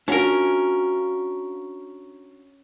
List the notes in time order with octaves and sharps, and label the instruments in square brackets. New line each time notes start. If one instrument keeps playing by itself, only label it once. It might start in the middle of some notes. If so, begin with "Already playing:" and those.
[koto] C#4 A#4 [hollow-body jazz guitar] D4 F4 F#4